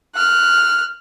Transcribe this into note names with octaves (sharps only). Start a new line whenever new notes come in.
F6 F#6